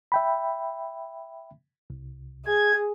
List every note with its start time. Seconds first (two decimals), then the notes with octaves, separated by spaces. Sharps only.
0.12 E5 G5 B5
1.90 C2
2.46 G#4 G#6